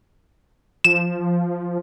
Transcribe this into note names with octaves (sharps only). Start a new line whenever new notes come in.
F3 E7